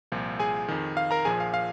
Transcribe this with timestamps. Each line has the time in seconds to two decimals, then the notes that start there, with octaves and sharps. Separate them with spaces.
0.12 C2 A#2 F3
0.39 G#4 G#5
0.68 F2 D#3
0.97 F5
1.11 A#4 A#5
1.25 A#1 A#2 F3 G#4 G#5
1.40 F5
1.54 F5